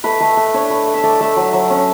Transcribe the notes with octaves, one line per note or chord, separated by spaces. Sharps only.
A3 B4
A3 B4
A3 B4
D4 C#5
A3 B4
A3
E5
A3 D5
A3 E5
F#3
F#3
C#4